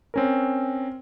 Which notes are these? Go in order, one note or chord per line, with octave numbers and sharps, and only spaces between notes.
C4 C#4 A#4